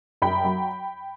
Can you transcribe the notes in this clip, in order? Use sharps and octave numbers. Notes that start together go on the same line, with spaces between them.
F#2 G5 B5
F#3